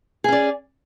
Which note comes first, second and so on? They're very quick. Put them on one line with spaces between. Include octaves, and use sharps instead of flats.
G#4 C#4 D5